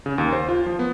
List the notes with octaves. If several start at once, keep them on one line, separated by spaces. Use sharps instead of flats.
C#3
D#2
C5
F4
F3
B3